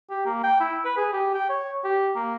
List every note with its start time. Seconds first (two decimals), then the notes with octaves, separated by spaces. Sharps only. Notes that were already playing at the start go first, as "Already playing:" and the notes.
0.10 G4
0.26 A#3
0.44 G5
0.60 E4
0.85 B4
0.97 G#4
1.13 G4
1.34 G5
1.49 C#5
1.84 G4
2.16 A#3